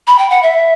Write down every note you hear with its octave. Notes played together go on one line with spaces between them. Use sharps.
B5
G5
F#5
E5